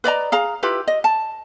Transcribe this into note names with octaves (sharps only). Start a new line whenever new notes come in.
B4 D5 D#5 A#5
G#4 F5 A#5
E4 F4 G4 B4
D#5
A5